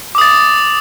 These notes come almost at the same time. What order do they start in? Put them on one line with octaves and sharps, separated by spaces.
D6 D#6 A6